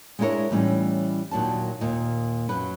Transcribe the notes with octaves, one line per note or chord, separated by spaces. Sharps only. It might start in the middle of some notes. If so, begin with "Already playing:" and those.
G#3 B3 D4 E4 A#4 C#5
A2 E3 G3 C#4 D#4
D#2 A#2 F#3 D4 A5
D#2 A#2 D#5
F#2 F#3 B4